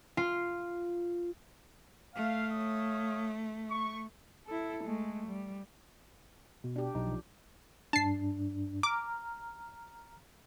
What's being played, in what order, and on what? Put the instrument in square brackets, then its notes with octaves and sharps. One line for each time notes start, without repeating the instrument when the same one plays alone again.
[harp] F4
[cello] A3 [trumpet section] F5
[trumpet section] C#5 F5 D#6
C#6
[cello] E4 A4
G#3 A3
G3
[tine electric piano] B2
[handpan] D4 G4
[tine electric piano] B1 D#4
[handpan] F3
[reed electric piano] G2 D4 [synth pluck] A5 C7
[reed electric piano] A#5 F6 [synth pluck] D6